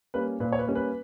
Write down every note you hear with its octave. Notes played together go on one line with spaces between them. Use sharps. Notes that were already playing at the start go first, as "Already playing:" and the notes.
G3 A#3 C#4 B4
A#2 B4
C#5
B4
G3 A#3 C#4
B4